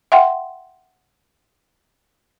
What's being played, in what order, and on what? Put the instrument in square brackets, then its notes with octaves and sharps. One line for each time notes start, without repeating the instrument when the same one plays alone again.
[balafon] E5 F#5 G5 C6